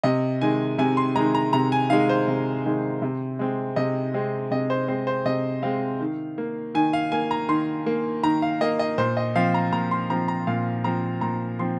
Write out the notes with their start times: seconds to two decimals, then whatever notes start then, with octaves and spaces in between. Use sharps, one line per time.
0.03 C3 D#5
0.41 D#3 G#3 G#5
0.78 C3 G#5
0.97 C6
1.15 D#3 G#3 A#5
1.35 A#5
1.53 C3 A#5
1.72 G#5
1.90 D#3 G#3 F5
2.09 C5
2.28 C3
2.65 D#3 G#3
3.02 C3
3.39 G#3 C4
3.76 C3 D#5
4.14 G#3 C4
4.51 C3 D#5
4.70 C5
4.88 G#3 C4 C5
5.07 C5
5.25 C3 D#5
5.63 G#3 C4 F5
6.00 D#3
6.38 A#3
6.75 D#3 G#5
6.93 F5
7.12 A#3 G#5
7.31 A#5
7.49 D#3 C6
7.86 A#3
8.23 D#3 A#5
8.42 F5
8.61 A#3 D#5
8.79 D#5
8.98 A#2 C5
9.17 D#5
9.35 F3 C4 F5
9.54 A#5
9.72 A#2 A#5
9.91 C6
10.10 F3 C4 A#5
10.28 A#5
10.47 A#2 F5
10.84 F3 C4 A#5
11.21 A#2 A#5
11.59 F3 C4 C6